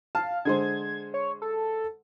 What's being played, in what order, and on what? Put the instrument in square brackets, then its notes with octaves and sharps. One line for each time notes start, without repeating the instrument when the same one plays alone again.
[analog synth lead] F5 [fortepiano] A5
[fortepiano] D3 G#3 C5 [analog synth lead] G#6
[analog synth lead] C#5
A4